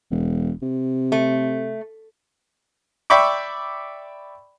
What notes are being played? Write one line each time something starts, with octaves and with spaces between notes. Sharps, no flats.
E1
C3
A3
D5 E5 G5 B5 C#6 D6